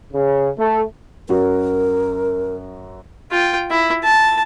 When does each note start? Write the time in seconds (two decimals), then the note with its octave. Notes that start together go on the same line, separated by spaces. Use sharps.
0.13 C#3
0.58 A3
1.29 F#2 F#4 A#4
3.31 F4 G5
3.71 E4
4.04 A5